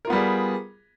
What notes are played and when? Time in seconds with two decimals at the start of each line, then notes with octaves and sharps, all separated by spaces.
0.05 A#4
0.07 F4
0.10 B3
0.13 G3
0.15 G#4